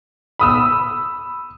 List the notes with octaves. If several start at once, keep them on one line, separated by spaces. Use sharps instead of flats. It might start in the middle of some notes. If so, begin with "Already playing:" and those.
B5 D#6 E6